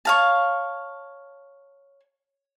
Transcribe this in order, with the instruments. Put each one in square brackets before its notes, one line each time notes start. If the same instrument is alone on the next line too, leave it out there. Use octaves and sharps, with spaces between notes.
[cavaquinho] C#5 F5 A5